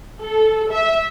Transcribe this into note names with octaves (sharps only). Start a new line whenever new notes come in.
A4
E5